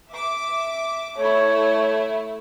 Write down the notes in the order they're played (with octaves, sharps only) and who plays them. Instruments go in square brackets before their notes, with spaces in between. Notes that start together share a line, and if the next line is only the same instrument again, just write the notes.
[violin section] E5 D6
[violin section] A3 E4 [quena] C#5